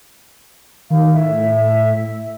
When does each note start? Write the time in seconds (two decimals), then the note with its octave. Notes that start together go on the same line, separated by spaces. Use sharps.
0.90 D#3 F5
1.14 A2 E5